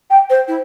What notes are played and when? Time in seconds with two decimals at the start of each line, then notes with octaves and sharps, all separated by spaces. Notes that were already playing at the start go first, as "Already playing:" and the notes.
0.10 G5
0.29 C5
0.48 E4